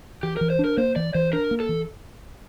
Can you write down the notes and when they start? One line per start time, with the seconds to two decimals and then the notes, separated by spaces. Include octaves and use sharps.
0.23 E3 G4
0.37 E3 A#4
0.50 C5
0.59 D4
0.64 A#4
0.77 A#3 C5
0.96 E3 D5
1.14 E3 C5
1.33 D4 A#4
1.51 A#3
1.60 A4
1.69 E3